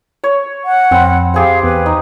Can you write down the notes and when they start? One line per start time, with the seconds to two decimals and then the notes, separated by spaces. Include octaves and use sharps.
0.24 C#5
0.65 F#5
0.91 F2 C4 B5
1.34 G4 G#4 C5 F5
1.63 E2 B4
1.86 D#4